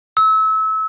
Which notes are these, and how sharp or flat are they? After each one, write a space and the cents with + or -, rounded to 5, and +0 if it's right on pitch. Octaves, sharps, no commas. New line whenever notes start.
E6 -30